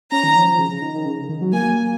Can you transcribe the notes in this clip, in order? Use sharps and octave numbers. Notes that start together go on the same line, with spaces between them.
C#4 A#5
D#3
F3
F3
C#3
C#3
D#3
D#3
C#3
D#3
F#3
A#3 G#5